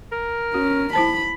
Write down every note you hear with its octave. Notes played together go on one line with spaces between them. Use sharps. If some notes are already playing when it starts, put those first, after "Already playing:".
A#4
C#4 F#4
E4 C5 A5 B5